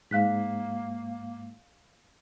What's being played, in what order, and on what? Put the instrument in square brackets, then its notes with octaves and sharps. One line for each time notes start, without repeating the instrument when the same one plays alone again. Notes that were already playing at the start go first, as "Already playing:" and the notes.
[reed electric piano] G#2 [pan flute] A#3 [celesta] F5 F#6 B6